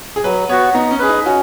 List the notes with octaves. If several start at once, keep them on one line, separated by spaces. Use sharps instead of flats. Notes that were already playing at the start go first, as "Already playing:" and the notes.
G#4
F#3 B4
B3 F#4 C#5
B3 D#4
C#4
G#4 B4
D#4
C#4 F#4